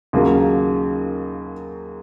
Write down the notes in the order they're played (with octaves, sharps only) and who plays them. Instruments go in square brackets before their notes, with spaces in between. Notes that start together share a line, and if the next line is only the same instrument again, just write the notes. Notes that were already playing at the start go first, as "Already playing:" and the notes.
[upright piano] D#2 C#3 F#3 A#3 F4